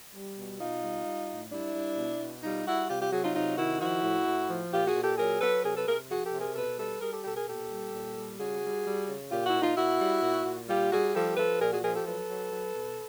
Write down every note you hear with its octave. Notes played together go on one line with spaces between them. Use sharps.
G3
B2
B2 D#4 F4
G3
G3
A2
G3 D4 E4
G3
B2
B2
G3 D#4 F4
G3 E4 F#4
C3 F4 G4
F4 G4
F#3 F#4 G#4
D#4 F4
C3 D#4 F4
D#3 E4 F#4
F3 E4 F#4
A2
A2
F3
A#2 F4 G4
F#4 G#4
A#2
G4 A4
F#3 G#4 A#4
F#3 A4 B4
C3 G#4 A#4
A4 B4
C3 G#4 A#4
F3 F#4 G#4
G4 A4
C3
G#4 A#4
B2 A4 B4
G3 A4 B4
G3 G#4 A#4
G4 A4
B2 G4 A4
G#4 A#4
A#2 G4 A4
G3
A#2
G3
C#3 F#4 G#4
G3
G3
C#3
A#2 F4 G4
E4 F#4
A#2
D#4 F4
A#2 E4 F#4
G3
A#2
A#2
G3 F4 G4
G3 F#4 G#4
F3 G4 A4
F3 A4 B4
A#2 G#4 A#4
F#4 G#4
F3 G#4 A#4
G4 A4
F#3 A4 B4
F#3
F#3
B2